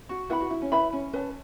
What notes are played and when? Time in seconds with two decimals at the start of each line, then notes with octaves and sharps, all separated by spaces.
0.09 F#4
0.30 E4 B4 F#5 B5
0.40 F#4
0.50 E4
0.62 C#4
0.71 E4 B4 E5 B5
0.93 C#4
1.13 C#4 B4 A5